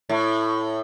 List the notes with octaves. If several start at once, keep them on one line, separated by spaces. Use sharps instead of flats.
A2